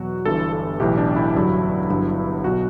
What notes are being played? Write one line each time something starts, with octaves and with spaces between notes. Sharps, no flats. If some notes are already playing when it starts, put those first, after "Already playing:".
Already playing: E2 B2 F#3 F#4
G1 G2 E3 A4
A4
B1 A2 E3 G4
D4
E4
A1 G2 D3 F#3
G1 G2 F#3
B1 B2 F#3 F#4